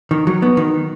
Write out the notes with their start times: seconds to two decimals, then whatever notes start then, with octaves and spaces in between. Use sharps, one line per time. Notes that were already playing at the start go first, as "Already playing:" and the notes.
0.11 D#3
0.27 F#3
0.42 B3
0.57 D#3